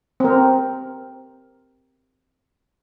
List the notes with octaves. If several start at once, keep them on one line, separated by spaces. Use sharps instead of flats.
C4 A#4